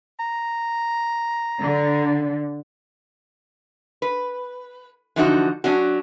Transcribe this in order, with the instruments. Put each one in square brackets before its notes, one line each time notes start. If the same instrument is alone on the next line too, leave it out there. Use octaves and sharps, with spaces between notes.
[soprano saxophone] A#5
[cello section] D3
[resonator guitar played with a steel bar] B4
D3 E3 F3 A3 D#4 F#4
F#3 C#4 D4 F#4